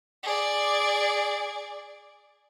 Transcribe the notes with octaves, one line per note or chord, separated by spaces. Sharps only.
G#4 D5